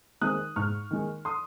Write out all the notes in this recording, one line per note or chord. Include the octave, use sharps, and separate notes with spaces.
D#3 G#3 C4 D#4 D#6 F#6
G#2 C#6 F6
D#3 G#3
C6 D#6